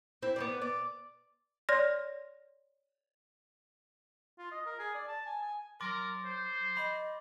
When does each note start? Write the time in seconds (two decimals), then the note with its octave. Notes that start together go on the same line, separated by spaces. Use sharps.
0.22 C4 E4
0.36 B3 C#4 D5
0.62 D5
1.69 C#5 D5 C6 F6 A#6
4.38 F4
4.52 D#5
4.66 A#4
4.79 G#4
4.94 D5
5.08 A5
5.26 G#5
5.42 G#5
5.81 F#3 A#4 C6 D6 A6
6.25 C5
6.77 D#5 B5